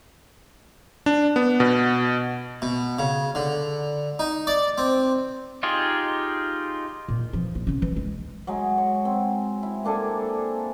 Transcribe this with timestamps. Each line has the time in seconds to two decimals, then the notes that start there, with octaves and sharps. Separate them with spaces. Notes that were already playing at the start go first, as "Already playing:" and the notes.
1.06 D4
1.36 B3
1.60 B2
2.62 B2
2.99 C#3
3.35 D3
4.19 D#4
4.47 D5
4.78 C4
5.63 D#4 F4 G4 G#4
7.08 A#2
7.33 E3 F3
7.55 A#1
7.67 C#3 C#4
7.82 E3
7.96 G#3
8.47 F#3 G#3
8.78 C#5
9.05 C4
9.63 E4
9.84 A#3 D4 A4 G#5